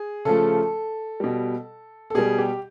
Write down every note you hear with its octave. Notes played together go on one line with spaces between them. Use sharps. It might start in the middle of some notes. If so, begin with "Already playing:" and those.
Already playing: G#4
C#3 F3 A3 A4
B2 G3
A4
B2 G3 G#4
G4